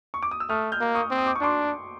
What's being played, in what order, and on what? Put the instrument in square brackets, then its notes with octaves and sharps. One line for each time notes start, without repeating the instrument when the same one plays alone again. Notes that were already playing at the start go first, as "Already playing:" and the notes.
[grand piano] C#6
D6
D#6
E6
[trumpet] A3 [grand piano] D#6 F6
[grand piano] F6 G6
[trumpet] A#3
[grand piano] C#6 D#6
[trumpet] C4
[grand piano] D#6
D6
C#6
[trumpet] D4 [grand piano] C6 D6